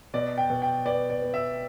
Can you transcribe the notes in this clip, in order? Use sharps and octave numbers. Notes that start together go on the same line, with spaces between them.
B2 D5
G5
B2
G5
B3 D5
D5
B3
E5